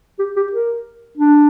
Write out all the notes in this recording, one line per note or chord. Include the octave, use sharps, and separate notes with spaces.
G4
G4
A#4
D4